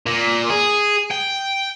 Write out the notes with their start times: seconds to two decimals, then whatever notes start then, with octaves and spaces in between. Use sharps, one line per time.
0.06 A#2
0.50 G#4
1.11 G5